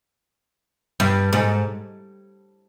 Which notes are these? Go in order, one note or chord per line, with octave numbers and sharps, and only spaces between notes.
G2
G#2